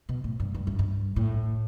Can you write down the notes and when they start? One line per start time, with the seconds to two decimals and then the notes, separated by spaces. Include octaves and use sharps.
0.09 B2
0.24 A2
0.40 G2
0.54 G2
0.67 F#2
0.79 G2
1.16 A2